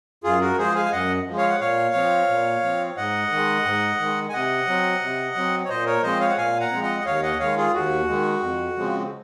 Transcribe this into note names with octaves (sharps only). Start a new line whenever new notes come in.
F#2 F4 G#4
F#4 A#4
F3 G#3 G#4 C5
F5 G#5
G#5
F#2 D#5 F#5
F3 G#3
C#5 F5
F#5
A#2 C#5 F5
F3 C4
A#2
F3 C4
G#2 D#5 F#5
D#3 G#3
G#2
D#3 G#3
G#5
C3 D#5 F#5
F#3 C4
C3
F#3 C4
C#5
A#2 C5 D#5
A#4 C#5
F3 G#3 C4 C5 D#5
C#5 F5
F#5
A#2 F5 G#5
F#5 A#5
F3 G#3 C4
D#5 F#5
D#5
D#2 C#5 F5
D#5 F#5
D#3 G#3 C#5 F5
F4 G#4
D#2 F#4
D#3 G#3
F2
C#3 F3 G#3 C4